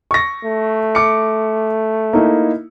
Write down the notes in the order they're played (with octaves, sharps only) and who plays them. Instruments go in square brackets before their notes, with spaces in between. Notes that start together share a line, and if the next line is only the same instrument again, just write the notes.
[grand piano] C#6 A#6
[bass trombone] A3
[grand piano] D6 C#7
A#3 D#4 E4